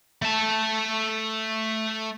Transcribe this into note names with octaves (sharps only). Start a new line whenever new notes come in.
A3 A5